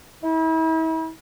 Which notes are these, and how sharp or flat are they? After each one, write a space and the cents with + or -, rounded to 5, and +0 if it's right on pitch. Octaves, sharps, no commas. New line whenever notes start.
E4 -40